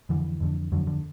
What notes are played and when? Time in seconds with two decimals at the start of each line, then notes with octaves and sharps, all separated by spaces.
0.09 F2 D3 E3
0.40 F2 D3
0.72 F2 D3 F#3
0.87 D3